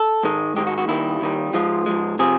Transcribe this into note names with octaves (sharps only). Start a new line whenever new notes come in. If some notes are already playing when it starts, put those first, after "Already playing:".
Already playing: A4
G#2 D#3 G#3
G#2 D#3 G#3 G4
F#4
F#4
D#2 D#3 G3 E4
D#2 D#3 G3
G#2 F3 G#3 F4
G#2 F3 G#3
C3 F3 G#4